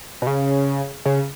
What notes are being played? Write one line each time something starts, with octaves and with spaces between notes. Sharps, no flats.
B2
C#3
C#3